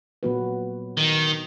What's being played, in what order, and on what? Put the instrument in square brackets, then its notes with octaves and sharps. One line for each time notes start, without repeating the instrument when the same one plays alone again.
[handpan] A#2 F#3 B3 F#4 B4
[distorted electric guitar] D#3